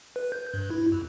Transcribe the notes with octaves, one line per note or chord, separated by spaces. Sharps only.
B4
G6
G2
E4
F2